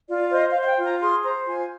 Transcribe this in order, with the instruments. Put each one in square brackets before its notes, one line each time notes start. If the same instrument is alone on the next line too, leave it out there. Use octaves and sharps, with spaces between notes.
[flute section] F4 D5
C5 D#5
F5
C5
F5
G5
F4
A#5
G#4 C6
C5 A#5
F4 G#5